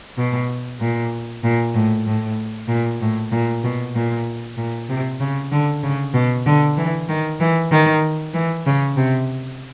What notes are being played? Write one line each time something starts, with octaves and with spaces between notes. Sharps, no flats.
B2
A#2
A#2
A2
A2
A#2
A2
A#2
B2
A#2
A#2
C3
C#3
D3
C#3
B2
D3
E3
D#3
E3
D#3
E3
C#3
C3